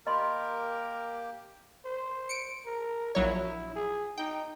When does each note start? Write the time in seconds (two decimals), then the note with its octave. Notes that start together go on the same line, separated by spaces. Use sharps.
0.07 A#3 G4 A#4 D#5 G5 B5 C6
1.85 C5
2.29 C#7 D7
2.65 A#4
3.15 A#1 F#3 E4 C#5
3.75 G#4
4.18 D#4 G5